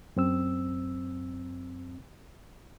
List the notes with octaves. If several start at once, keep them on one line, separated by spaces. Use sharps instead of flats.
F#2 C4 E6